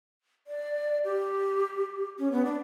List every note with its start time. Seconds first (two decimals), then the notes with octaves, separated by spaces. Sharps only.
0.47 D5
1.04 G4
2.19 C#4
2.32 B3
2.45 D4